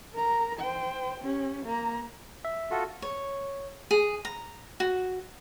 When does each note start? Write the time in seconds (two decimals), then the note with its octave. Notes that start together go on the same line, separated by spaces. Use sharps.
0.14 A#4 A#5
0.60 C5 G5
1.21 C#4 G4
1.66 A#3 A#5
2.45 E5
2.71 F4 F#4 A4
3.02 C#5
3.91 G#4
4.25 A#5
4.80 F#4